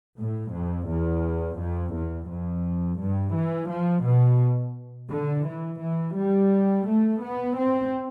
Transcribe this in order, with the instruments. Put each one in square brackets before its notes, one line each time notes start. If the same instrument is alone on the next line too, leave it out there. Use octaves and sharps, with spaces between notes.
[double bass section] A2
F2
E2
F2
E2
F2
G2
E3
F3
B2
D3
E3
E3
G3
A3
B3
C4